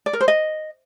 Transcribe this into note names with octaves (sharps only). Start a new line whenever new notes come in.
D5
A#4
C5
D#5